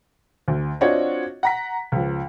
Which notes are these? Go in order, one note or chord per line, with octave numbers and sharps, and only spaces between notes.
D2
C4 D4 F4 F#4 C#5 D#5
F#5 A#5 B6
C#2 F3